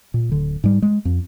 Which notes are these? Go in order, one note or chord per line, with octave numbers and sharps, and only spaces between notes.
A#2
D1 D3
G#2 G3
G#3
F2